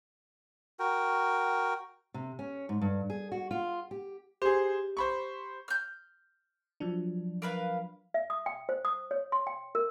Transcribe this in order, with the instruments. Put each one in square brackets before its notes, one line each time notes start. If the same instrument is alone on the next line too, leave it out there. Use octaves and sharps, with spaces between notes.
[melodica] F#4 A#4 G5
[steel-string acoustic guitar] C3
C#4
G#2
G2
G#4
F#4
F4
G4
[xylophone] G4 [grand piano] G#4 C5
[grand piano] C5 B5 C#6
[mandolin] F6 G6
[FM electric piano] F3 F#3 D4
[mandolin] A#4 B4 F5
[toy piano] E5
D#6
G5
C5
D#6
C#5
C6
G5
A#4